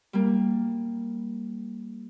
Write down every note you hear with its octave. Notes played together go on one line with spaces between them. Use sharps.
G3 A#3